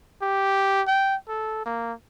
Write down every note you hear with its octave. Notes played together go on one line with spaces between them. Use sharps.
G4
G5
A4
A#3